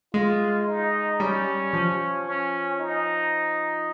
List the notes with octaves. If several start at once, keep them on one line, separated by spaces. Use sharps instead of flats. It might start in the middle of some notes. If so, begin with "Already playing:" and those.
G#3 F4
D#4
G3 C#4
F3
C#4
D#4